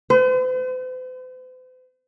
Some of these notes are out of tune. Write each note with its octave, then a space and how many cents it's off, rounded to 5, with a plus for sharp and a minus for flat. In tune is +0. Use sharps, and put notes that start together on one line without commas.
C5 -45